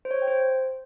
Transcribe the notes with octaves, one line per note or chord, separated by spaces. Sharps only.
C5
C#5
C5
G5
C5